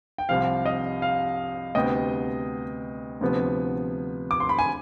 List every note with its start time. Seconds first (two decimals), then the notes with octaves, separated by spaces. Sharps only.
0.18 G5
0.29 C2 C3 F3 F5
0.66 D#5
1.02 F5
1.75 D2 C3 G3 B3 D#5 G5
3.21 D2 C3 F3 B3
4.31 D6
4.40 C6
4.49 B5
4.59 G#5